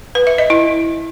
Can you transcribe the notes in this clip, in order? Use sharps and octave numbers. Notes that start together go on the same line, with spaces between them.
B4
E5
D#5
E4